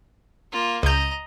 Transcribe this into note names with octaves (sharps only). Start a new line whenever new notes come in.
A#3 F4
C#2 D#5 A#5 G6